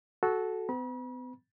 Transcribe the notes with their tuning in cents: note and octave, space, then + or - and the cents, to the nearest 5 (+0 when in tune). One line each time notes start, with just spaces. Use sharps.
F#4 +0 A4 -15
B3 +45 B5 -40